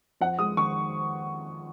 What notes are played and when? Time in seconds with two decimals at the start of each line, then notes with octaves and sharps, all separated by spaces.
0.21 F2 F#5
0.39 G#3 D#6
0.57 D#3 C#6